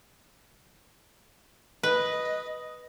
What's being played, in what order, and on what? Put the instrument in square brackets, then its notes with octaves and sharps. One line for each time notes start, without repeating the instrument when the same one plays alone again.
[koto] B4 [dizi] D#5